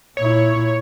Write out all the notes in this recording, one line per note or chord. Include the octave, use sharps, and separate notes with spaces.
A#2 E4 C#5